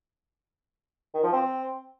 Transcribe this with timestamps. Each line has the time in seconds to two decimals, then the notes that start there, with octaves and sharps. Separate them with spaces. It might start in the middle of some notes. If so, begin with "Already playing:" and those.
1.14 D#3
1.23 F3
1.33 C4